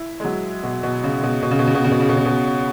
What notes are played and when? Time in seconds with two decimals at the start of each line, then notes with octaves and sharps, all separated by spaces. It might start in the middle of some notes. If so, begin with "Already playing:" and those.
Already playing: E4
0.20 G#3
0.24 F#3
0.63 B2
0.83 B2
1.04 C#3
1.23 B2
1.42 B2
1.51 C#3
1.59 B2
1.67 C#3
1.75 B2
1.84 C#3
1.92 B2
2.00 C#3
2.09 B2
2.17 C#3
2.25 B2